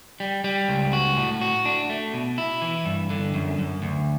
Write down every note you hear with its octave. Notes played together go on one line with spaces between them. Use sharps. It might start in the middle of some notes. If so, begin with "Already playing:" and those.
G3
G3
C#2
F#4
A2
F#4
D4
A3
B2
E4
E3
G2
D3
F#2
F#2
D2